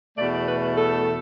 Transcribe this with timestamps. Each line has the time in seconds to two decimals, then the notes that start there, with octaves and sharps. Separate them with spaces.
0.17 E2 B2 A3 D5
0.47 B4
0.78 A4